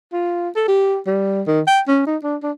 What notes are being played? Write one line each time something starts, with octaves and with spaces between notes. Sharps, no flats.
F4
A4
G4
G3
D#3
G5
C#4
D#4
D4
D4